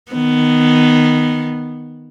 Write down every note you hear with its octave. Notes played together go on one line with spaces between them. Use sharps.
D#3 B3